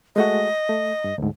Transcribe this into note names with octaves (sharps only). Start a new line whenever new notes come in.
G#3 A3 F#4 D#5
A3
G2
D2 G#2